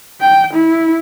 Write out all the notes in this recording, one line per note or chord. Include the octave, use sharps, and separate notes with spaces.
G5
E4